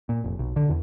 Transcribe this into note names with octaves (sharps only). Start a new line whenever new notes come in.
A#2
F1
B1
D3
E2